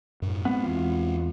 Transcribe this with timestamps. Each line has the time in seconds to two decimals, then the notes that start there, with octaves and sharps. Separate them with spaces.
0.22 F#2 A2
0.45 G#3 B3 C4 F#5
0.63 E2 F4